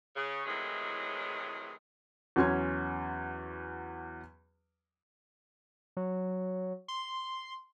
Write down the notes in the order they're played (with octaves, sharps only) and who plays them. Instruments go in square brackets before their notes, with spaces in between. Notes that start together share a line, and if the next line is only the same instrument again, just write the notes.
[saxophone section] C#3
A2 C3 D#3 E3 F#3 G#3
[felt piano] E2 F#3 C#4 C6 G#6
[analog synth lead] F#3
C6